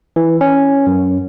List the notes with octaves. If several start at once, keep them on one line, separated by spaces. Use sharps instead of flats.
E3
C#4
F#2